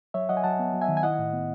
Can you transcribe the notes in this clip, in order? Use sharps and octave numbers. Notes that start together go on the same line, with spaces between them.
F#3 C#5 E5
F#3 D#5 F#5
G#5
F#3 F#5 A5
B3
F#3
E5 G#5
D#3
G#5
E4 D#5 F#5
A2
B3